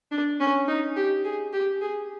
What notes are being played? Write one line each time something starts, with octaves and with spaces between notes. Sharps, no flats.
D4
C#4
D#4
G4
G#4
G4
G#4